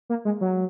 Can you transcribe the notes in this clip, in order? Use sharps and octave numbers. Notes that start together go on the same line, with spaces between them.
A#3
G#3
F#3